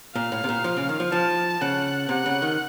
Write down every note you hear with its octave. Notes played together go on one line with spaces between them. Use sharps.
A#2 F5
A2
C3
A#2
F3
C#3
D#3
F3
F3 A5
C#3 F#5
C3 F#5
C#3
D#3